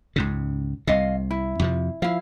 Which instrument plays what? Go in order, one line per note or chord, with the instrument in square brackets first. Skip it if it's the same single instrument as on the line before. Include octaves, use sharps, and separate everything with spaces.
[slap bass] C#2 G#2 C#3
[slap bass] C2 C3 [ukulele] D#5 F5
[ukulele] E4
[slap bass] F2 C3 F3
[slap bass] F3 [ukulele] E4 F5